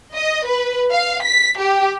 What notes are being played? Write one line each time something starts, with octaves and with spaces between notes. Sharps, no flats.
D#5
B4
F5
B6
G4